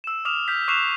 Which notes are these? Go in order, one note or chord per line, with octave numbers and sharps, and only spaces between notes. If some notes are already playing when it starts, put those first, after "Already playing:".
E6 E7
D6 D#6 F6 E7 F7
F6 G6 B6
C#6 D6 F#6 C7 E7 F7